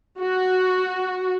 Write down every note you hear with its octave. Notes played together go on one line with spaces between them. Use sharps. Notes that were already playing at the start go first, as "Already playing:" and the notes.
F#4